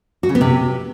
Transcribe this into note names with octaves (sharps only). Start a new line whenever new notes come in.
F#4
C#3
B3
C3